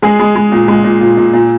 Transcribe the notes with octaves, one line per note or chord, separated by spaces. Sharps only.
G#3 G#4
G#3
G#3
A#2
G#3
A#2
A#2
A#2
A#2